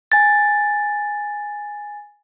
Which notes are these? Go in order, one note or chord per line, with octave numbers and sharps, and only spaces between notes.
G#5 A6